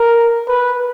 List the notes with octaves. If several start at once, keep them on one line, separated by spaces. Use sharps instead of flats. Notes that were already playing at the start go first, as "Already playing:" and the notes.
Already playing: A#4
B4